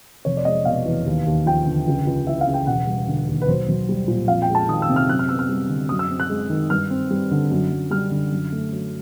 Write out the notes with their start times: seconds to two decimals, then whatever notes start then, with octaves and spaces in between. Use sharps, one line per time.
0.25 F1 C#5
0.37 D5
0.45 G#3 D#5
0.65 B2 F5
0.86 E2
1.06 D#2
1.27 D#2
1.46 F3 G5
1.67 D3
1.87 C#2
2.07 C#2
2.27 E3 E5
2.41 F5
2.47 C#3
2.54 G5
2.67 E1 F#5
2.87 G3
3.08 D3
3.27 D#2
3.41 B4
3.48 B1 C5
3.69 B1
3.89 G3
4.08 A#2
4.28 F2 F5
4.42 G5
4.49 G#3
4.55 A5
4.68 D#3 D#6
4.82 E6
4.89 C3
4.96 F6
5.09 F#2 F#6
5.19 F6
5.29 B3 E6
5.39 F6
5.49 G3
5.69 D3
5.89 F#2 D#6
5.99 E6
6.10 C4
6.20 F#6
6.29 G#3
6.50 D#3
6.70 G2 F6
6.90 C4
7.11 G3
7.31 D3
7.51 F#2
7.70 F#2
7.91 G3 F6
8.11 D3
8.32 F#2
8.52 A3
8.72 F#3